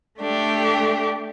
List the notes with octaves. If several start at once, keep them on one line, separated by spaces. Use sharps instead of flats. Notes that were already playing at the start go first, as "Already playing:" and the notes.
A3 D4 G4